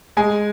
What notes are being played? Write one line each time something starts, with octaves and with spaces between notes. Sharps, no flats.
G#3 G#5